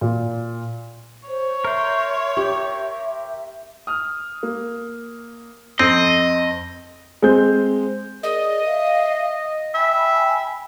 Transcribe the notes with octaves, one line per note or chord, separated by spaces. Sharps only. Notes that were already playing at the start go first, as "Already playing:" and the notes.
A#2
C5 C#5
A#4 C5 E5
G4
D#6 F6
A#3
F2 C4 D#5
G#3 C4 G6
G#4 A#4 D5 D#5
E5 F5
E5 G5 G#5 B5